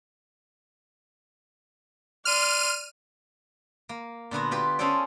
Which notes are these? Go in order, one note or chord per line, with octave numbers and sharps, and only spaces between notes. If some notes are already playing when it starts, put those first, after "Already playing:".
D5 C6 F6 D#7
A#3
A#2 D3 B3 F#4
F4 G4 B4
C#4 G#4 A4 C5 D5